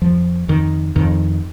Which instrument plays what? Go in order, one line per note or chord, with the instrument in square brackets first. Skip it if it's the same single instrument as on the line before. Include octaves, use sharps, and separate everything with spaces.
[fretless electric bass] F2 F3
F2 D#3
F2 D#3